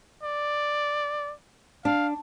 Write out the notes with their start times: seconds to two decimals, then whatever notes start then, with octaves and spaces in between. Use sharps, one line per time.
0.23 D5
1.85 D4 F5